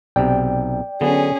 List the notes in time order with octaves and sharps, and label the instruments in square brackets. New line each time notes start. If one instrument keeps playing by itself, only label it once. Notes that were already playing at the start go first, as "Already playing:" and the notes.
[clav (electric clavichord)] B1 C3 [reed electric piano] D5 G5
[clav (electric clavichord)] D3 F#3 B3 [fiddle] C#4 G#4